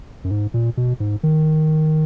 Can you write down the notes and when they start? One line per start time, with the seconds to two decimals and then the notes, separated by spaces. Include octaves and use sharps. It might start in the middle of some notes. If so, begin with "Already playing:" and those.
0.24 F#2
0.31 G#2
0.54 A#2
0.77 B2
1.00 G#2
1.23 D#3